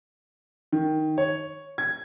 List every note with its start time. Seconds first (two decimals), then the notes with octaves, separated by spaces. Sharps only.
0.72 D#3
1.18 C#5
1.78 G#6